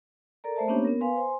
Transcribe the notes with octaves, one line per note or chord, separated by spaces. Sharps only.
A4 A#4 D5 A#5
A3 C5 E5 A5
A#3 B3 C#4 D4 G4 C#5
B3 A#4
B4 F5 G#5 C6
C5 G#5 C6